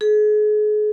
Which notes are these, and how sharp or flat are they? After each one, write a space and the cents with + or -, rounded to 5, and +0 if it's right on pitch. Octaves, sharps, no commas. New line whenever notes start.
G#4 +35